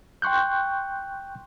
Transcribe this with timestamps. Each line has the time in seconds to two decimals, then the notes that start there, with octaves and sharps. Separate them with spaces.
0.22 G5 C6 C#6 F#6 G6